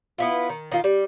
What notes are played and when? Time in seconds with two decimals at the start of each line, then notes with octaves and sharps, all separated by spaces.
0.18 B3 E4 F4
0.49 D#3
0.72 D#3 F4
0.84 G3